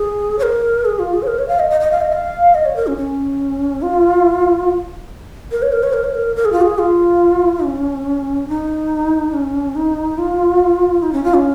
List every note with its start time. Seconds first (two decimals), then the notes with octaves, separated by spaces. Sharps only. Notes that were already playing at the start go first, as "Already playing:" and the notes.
Already playing: G#4
0.39 C#5
0.43 A#4
0.85 G#4
0.99 F4
1.14 G#4
1.23 C#5
1.27 A#4
1.39 C#5
1.48 F5
1.59 D#5
1.70 D#5
1.81 D#5
1.91 F5
2.01 D#5
2.12 F5
2.55 D#5
2.65 C#5
2.76 A#4
2.87 C#4
2.97 C#4
3.82 F4
5.51 A#4
5.62 C#5
5.72 A#4
5.83 C#5
5.93 A#4
6.04 C#5
6.14 A#4
6.36 A#4
6.45 G#4
6.52 F4
6.62 G#4
6.78 F4
7.63 C#4
8.48 D#4
9.33 C#4
9.75 D#4
10.18 F4
11.02 D#4
11.13 C#4
11.24 F4
11.35 C#4